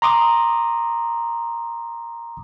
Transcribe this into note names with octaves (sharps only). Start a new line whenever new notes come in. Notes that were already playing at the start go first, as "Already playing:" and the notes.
A#5 C6 D6 D#6